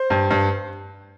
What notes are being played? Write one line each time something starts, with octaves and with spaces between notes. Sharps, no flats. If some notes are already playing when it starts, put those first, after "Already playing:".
Already playing: C5
G2
G2